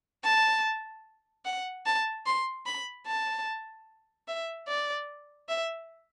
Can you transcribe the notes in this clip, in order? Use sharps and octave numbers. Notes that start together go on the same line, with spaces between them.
A5
F#5
A5
C6
B5
A5
E5
D5
E5